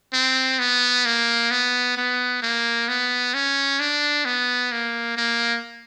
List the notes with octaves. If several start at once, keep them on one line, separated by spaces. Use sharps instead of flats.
C4
B3
A#3
B3
B3
A#3
B3
C#4
D4
B3
A#3
A#3